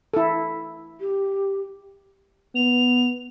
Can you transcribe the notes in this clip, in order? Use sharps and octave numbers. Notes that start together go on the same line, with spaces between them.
E4 A4
G4
B3 F7